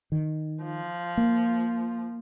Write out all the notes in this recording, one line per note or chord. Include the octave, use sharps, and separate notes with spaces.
D#3
F3
A#3